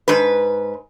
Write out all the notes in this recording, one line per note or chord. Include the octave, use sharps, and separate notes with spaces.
G#2 B4